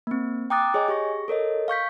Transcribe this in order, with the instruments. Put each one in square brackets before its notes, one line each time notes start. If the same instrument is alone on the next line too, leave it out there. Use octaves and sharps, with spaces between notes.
[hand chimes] A#3 C4
G5 A#5 D6 D#6 F#6 A6
G#4 C#5 D#5 G#5
G4 G#4 C#6 A#6
A4 A#4 C#5 D#5
F5 C#6 G6 B6